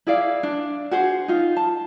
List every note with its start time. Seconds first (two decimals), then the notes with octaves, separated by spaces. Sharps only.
0.07 E4 G#4 D5 F5
0.43 D4
0.91 F#4 G#4 C5
1.28 D#4 F4
1.57 A5